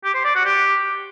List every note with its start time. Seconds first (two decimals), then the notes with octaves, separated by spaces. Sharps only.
0.04 G4
0.14 C5
0.24 D5
0.35 F#4
0.45 G4